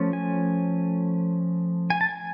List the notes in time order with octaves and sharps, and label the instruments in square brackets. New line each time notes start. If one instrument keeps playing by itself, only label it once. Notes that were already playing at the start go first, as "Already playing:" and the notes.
Already playing: [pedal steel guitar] F3 A3 C#4
G#5
G#5
A5
G#5